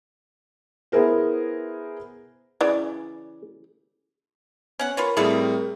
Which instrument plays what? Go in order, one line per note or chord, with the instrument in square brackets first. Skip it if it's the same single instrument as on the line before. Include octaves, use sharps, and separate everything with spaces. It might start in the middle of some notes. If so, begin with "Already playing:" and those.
[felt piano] B3 E4 G#4 A#4 C5
[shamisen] C#3 E3 [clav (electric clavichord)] D5
[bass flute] B3 [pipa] C#4 F#5
[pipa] F4 B4 C#5 [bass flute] A#4
[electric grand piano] A2 G3 C4 [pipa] E4 A4 F5 [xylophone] G#4